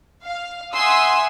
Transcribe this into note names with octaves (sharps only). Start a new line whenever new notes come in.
F5
E5 F#5 G#5 C6 D#6 E6